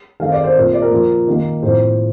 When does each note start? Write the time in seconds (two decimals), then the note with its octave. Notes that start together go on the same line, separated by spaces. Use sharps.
0.20 D#3 A3 C4 F5
0.32 D5
0.44 C5
0.56 A#2 A3 C4
0.73 D5
0.82 A#4
0.91 A#2 F3 A#3
1.27 D#3 A#3
1.62 A2 F3 C4 C5